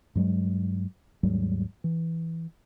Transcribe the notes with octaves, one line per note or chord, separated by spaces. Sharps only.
G2 F#3 G#3
D#2 G#2 F#3 G3
E3